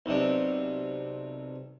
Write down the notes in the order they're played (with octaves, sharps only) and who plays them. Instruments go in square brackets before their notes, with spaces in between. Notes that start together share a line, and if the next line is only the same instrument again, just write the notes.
[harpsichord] B1 C3 D4